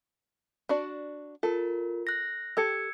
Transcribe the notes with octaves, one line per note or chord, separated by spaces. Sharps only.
D4 F#4 D5
F4 A4 A#4
F#6 A#6
G4 A4 E6 G#6 C#7